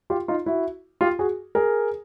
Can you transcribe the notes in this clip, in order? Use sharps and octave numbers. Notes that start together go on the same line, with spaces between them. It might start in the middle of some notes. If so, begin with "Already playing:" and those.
F4 G4
D#4 F4
E4 F#4
F4 G4
F#4 G#4
G#4 A#4